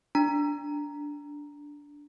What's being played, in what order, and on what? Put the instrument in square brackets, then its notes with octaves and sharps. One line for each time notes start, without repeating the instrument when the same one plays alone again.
[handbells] D4 A#5